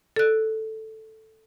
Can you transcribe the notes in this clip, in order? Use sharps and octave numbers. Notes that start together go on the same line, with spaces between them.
A4 F#6